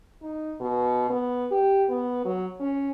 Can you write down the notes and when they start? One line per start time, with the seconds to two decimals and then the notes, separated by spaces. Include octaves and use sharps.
0.23 D#4
0.60 B2
1.10 B3
1.51 G4
1.90 B3
2.25 F#3
2.60 C#4